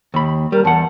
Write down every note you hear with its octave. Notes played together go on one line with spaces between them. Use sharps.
D#2 B5
G3 A#4
E2 F#5 A5